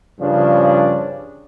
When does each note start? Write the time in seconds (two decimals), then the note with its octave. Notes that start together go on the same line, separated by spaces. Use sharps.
0.20 G2 C#3 F3 C#4 D4